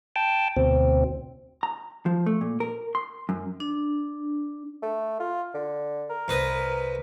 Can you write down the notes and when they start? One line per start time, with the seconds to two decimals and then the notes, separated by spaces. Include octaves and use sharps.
0.16 G5 A5
0.56 D2 B2 C4
1.63 A#5
2.06 F3
2.26 A3
2.41 A#2
2.60 A#4
2.95 C6
3.29 F#2
3.60 D4
4.83 A3
5.20 F4
5.54 D3
6.10 A#4
6.28 C2 B4 D#5